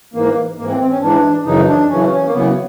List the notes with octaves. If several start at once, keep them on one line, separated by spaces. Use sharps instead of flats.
G#2 E3 A#3
G#2 E3 A#3
C4
C4
C#4
G#2 E3 D4
F#2 C#3 E3 D#4
D4
F#2 C#3 E3 C#4
C#4
A#3
F#2 C#3 E3 B3